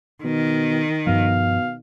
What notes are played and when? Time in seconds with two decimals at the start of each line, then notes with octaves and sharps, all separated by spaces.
0.24 B2 D#3
1.07 G2 B2 F3 F5